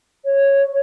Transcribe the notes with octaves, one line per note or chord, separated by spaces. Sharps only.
C#5